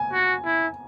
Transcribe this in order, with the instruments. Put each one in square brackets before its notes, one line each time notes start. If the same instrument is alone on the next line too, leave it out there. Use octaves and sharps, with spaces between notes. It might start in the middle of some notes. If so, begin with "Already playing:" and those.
Already playing: [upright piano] G#5
[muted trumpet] F#4
E4